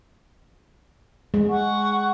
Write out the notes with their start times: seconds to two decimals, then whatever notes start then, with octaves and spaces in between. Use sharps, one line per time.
1.34 G#3
1.49 F#5 C#6